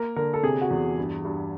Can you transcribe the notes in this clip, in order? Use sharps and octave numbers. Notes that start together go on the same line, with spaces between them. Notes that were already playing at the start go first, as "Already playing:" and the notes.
Already playing: A#3 A#4
D3 A#4
A4
C3 G#4
F#4
E2
G2
G2